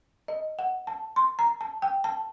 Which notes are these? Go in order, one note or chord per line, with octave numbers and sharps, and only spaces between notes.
D#5
F#5
A5
C6
A#5
A5
G5
A5